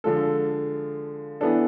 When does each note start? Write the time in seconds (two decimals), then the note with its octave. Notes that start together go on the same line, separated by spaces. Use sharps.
0.04 D3 F3 G#3 A4
1.41 E3 B3 D4 A4